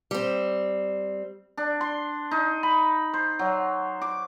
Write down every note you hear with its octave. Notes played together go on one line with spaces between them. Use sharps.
G3 C4
D4
C6
D#4
B5
C5
F#3
D6